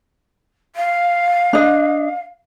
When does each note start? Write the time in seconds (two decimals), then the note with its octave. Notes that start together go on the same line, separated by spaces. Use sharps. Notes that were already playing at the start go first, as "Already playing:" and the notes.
0.75 F5
1.53 D4 D#5